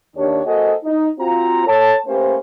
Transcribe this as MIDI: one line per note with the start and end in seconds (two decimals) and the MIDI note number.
0.17 0.40 39
0.17 0.40 62
0.17 0.40 67
0.17 0.40 73
0.45 0.73 58
0.45 0.73 66
0.45 0.73 68
0.45 0.73 69
0.45 0.73 72
0.45 0.73 75
0.84 1.07 63
1.19 1.67 60
1.19 1.67 65
1.19 1.67 66
1.19 1.67 82
1.67 1.95 69
1.67 1.95 73
1.67 1.95 81
2.07 2.37 57
2.07 2.37 58
2.07 2.37 61
2.07 2.37 67
2.07 2.37 71
2.07 2.37 72